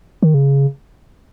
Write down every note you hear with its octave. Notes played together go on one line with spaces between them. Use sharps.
D#3
C#3